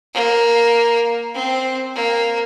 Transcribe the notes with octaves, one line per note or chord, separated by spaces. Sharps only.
A#3
C4
A#3